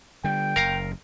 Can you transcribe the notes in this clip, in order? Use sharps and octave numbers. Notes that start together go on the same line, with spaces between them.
D3 G3 G5
F#1 A#4 F5 A#5